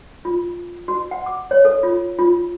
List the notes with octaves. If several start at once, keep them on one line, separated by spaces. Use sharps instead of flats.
F4
F#4
F#5
D6
C#5
A4
F4
F4